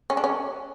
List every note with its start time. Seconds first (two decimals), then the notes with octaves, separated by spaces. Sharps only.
0.10 C#4
0.17 D4
0.24 C#4